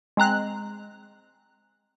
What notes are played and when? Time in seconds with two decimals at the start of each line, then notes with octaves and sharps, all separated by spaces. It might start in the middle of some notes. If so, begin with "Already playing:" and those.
0.17 G#3 C4 A#5 F#6